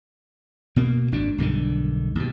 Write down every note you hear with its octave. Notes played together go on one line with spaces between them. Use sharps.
B2 A#3
G#1 F#2 D4
B1 G2 D3 D#3
D#2 B2